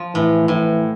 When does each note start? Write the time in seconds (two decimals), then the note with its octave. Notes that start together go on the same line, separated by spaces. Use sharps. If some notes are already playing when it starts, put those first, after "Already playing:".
Already playing: F3
0.15 A2 E3
0.48 A2 E3